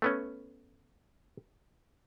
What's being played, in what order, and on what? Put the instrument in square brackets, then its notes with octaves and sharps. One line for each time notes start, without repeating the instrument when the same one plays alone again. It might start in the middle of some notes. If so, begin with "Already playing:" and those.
[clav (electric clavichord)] A3 B3 C#4